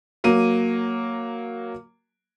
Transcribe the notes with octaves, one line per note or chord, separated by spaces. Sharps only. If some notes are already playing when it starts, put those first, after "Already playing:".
F#3 A#3 D#7